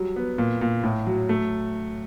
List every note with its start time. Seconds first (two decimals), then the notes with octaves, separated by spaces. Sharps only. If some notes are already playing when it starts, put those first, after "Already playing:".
Already playing: F#3 G3
0.16 B3
0.38 A#2
0.61 A#2
0.83 A2
1.07 F#3
1.29 A3